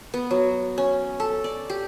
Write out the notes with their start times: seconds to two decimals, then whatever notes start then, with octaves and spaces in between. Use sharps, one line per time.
0.14 B3
0.31 F#3
0.78 C#4
1.20 A4
1.44 D5
1.70 G4